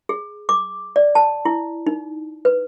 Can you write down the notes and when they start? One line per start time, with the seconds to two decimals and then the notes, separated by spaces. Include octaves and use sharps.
0.09 G#4
0.49 D6
0.96 D5
1.15 A5
1.45 E4
1.87 D#4
2.45 B4